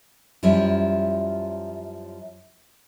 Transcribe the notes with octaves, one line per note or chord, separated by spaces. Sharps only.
F#2 F3 G3 E4